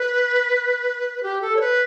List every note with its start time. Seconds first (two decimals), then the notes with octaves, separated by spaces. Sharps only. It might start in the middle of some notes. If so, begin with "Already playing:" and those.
Already playing: B4
1.23 G4
1.42 A4
1.56 C#5
1.61 B4